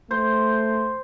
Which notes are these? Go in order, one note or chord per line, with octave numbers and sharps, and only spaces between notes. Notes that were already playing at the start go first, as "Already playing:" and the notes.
A3 C5